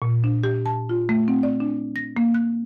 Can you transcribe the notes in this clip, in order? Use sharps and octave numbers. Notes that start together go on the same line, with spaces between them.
A#2
D4
G4
A5
F4
A3
C4
D5
D4
A#6
A#3
F#6